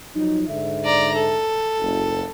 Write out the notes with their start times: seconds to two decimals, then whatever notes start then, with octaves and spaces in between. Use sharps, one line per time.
0.14 F3 F#3 D#4
0.48 G#2 D3 E5
0.85 D5 A#5
1.15 A4
1.79 F#1